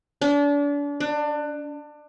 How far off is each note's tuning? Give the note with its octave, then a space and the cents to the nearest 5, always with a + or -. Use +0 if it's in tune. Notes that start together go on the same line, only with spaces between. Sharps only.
D4 -35
D4 +25